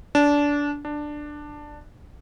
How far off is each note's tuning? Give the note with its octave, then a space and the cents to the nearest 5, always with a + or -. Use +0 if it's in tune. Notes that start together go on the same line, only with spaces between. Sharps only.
D4 -20
D4 +10